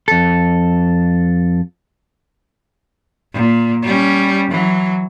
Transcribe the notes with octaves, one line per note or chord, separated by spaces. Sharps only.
F2 A4
A#2
G3 C#4
E3 F#3